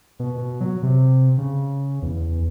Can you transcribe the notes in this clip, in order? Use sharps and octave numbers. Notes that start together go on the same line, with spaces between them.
B2
B2
F#3
C3
C#3
E2